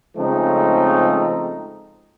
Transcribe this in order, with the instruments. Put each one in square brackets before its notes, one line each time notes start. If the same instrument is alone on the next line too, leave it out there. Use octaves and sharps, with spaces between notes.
[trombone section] C#3 F3 G#3 A3 C4 D#4